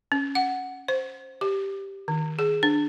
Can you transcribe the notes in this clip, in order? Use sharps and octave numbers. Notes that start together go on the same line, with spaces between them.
C#4
F#5
C5
G4
D#3
G#4
D4